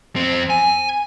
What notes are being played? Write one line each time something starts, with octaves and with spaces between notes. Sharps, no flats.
F2 C4
G#5